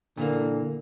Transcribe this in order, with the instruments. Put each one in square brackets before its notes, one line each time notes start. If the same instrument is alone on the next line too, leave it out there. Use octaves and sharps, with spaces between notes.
[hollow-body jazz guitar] A#2 E3 A#3 [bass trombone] D3